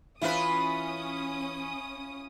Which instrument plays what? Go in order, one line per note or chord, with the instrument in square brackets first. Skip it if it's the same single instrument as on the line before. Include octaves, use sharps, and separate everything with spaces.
[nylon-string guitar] E3 E5 [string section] C#4 D#6 [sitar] E4 F4 B4